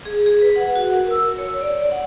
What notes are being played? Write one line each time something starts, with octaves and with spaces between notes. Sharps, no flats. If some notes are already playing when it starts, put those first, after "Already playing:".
G#4
G#4
B4
F#5
F#4
A#4
E6
C#5
D5
F#5